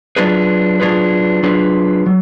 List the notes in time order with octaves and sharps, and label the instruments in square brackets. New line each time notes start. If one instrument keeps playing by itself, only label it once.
[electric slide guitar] F#3 D4 F4 G#4 B4
F#3 D4 F4 G#4 B4
F#3 D4 F4 G#4 B4
F#3